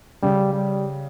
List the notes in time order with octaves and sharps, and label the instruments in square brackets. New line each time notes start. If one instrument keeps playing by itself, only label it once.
[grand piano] C#3 [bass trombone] G3
[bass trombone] G3